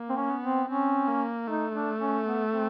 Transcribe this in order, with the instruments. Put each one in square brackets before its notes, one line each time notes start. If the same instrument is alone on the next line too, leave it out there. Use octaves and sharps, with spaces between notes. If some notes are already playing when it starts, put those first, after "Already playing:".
Already playing: [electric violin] A#3
[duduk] C4
C#4
[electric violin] B3
[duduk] C4
[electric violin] C4 [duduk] C#4
[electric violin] A#3
[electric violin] A3 [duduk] D#4
[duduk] D4
C#4
B3
C4